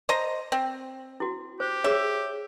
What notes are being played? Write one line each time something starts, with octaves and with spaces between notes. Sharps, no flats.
C5 D#5 A#5
C4
E4 F#4
G4 C5
G#4 C#5 E5